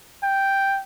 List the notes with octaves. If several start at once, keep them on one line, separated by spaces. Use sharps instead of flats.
G5